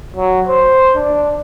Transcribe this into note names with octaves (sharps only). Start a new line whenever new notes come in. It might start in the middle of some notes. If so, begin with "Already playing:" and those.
F#3
C5
D4